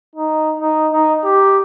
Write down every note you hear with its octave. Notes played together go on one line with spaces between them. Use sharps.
D#4
D#4
D#4
G4